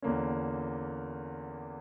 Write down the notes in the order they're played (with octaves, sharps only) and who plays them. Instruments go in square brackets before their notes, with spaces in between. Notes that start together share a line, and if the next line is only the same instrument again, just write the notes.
[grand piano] E2 D3 A#3 C#4